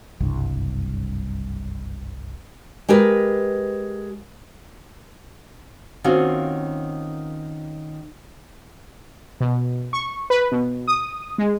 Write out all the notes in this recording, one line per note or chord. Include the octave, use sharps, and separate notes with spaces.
F#1 C2 G2
G#3 G4 A#4 B4
D#3 A#3 C4 C#4 F4 F#4
B2
C#6
B4
B2
D#6
G#3